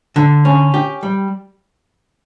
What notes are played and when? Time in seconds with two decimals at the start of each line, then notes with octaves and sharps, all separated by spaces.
0.16 D3
0.45 C#4
0.74 G4
1.03 G3